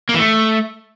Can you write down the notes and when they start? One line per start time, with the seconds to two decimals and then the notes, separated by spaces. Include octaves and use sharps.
0.09 A#3
0.14 E3
0.19 A3